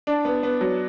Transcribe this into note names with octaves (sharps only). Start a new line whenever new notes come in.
D4
B3
B3
F#3